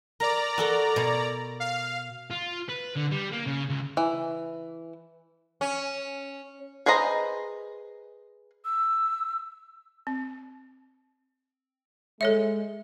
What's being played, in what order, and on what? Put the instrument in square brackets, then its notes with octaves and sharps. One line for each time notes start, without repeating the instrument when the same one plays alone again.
[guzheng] A#4 [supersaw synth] D5 A#5
[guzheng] F#4 A4 A#4
B2 C#5
[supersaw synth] F5
[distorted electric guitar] F4
B4
D3
G3
A#3
C#3
C#2
[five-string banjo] E3
[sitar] C#4
[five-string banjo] G#4 B4 C5 D#5 A#5
[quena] E6
[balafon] C4
[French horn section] G#3 [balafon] A4 C#5 E5